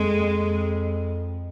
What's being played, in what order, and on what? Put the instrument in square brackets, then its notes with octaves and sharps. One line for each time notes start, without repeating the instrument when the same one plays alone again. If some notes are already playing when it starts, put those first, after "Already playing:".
Already playing: [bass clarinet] F2 [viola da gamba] G#3